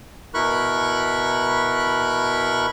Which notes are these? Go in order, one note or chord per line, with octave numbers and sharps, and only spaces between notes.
B2 E4 A#4 B5 C#6 F#6